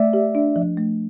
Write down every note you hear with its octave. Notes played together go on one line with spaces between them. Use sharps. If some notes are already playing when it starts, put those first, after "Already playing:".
Already playing: A3 D5 E5
G4
D4
F3
A3